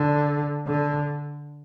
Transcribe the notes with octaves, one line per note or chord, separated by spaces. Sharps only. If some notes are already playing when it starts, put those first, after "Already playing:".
Already playing: D3
D3